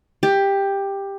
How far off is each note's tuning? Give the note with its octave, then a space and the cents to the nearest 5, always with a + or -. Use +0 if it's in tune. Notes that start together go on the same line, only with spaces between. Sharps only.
G4 +10